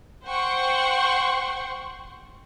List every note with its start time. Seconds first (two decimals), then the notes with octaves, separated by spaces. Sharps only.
0.25 C5 F#5 G5 C6 C#6